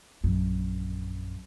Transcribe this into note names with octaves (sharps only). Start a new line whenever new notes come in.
A#1 F#2